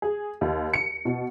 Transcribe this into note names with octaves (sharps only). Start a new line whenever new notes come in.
G#4
D#2
C#7
B2